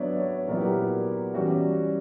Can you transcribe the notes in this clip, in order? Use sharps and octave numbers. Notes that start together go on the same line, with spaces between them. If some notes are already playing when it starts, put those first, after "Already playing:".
Already playing: F#3 B3 D4 C#5 D5 E5
C#5
A#2 F#3 B3 E4 A#4
G4
A#4
E3 G3 C#4 E4 F#4